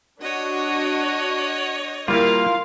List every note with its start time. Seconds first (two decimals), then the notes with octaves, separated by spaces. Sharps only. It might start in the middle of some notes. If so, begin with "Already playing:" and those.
0.21 D4 F#4 C#5 D#5
2.08 G3 A#3 E4 F4 A#4 F5